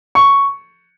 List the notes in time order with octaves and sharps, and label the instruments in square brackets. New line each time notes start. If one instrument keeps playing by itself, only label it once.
[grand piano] C#6